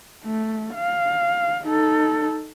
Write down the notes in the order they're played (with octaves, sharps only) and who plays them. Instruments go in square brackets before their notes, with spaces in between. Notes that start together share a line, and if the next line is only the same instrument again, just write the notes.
[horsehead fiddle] A3
F5
D#4 A4